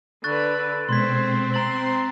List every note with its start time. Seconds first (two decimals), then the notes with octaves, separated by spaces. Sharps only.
0.24 D3 B4 C#6 F#6 A6
0.89 B2 G#3 C4 C5 C6 G#6 B6
1.54 A#5 C6 A6 F#7